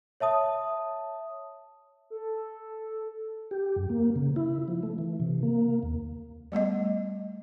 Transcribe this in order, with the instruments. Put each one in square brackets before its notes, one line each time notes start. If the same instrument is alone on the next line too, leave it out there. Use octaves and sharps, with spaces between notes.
[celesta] C#5 E5 A5 D#6
[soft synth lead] A4
[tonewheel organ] G4
F#2
A#3
C#3
E4
F3
A3
E3
C3
A#3
D#2
[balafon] G3 A3 B3 D#5